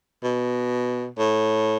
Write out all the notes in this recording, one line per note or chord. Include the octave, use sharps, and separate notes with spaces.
B2
A2